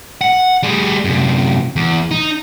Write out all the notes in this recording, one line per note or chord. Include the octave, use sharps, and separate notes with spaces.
F#5
G3 G#4
F#2 C3
E2
D#4